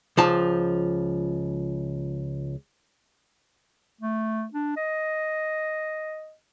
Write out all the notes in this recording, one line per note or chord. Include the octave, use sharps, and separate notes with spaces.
C#2 F3 A5
A3
D4
D#5